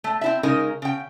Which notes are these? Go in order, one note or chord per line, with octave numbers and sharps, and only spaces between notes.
A3
C4 E4 E5
C#3 G#3 D#4 A#4
C#3 G5